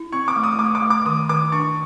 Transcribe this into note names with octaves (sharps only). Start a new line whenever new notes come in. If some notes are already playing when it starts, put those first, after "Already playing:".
Already playing: E4
C4 C#6
D6
A3
D#6
A3 D6
D6
A3
D6
D#3 D#6
D#3 D6
D4 C#6